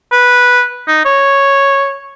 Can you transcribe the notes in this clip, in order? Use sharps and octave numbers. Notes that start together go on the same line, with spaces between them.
B4
D#4
C#5